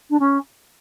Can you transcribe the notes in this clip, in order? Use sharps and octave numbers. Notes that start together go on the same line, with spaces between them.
D4
C#4